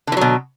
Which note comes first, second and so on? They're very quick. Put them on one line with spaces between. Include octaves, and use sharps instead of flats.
D3 E3 F#3 B2